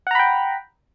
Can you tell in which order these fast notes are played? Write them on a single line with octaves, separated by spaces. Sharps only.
F#5 A#5 B5 G5